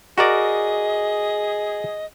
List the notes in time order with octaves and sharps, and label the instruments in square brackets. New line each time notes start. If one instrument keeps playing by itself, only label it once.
[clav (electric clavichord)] F#4 A#4 D5 [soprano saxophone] G#4 [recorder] D#5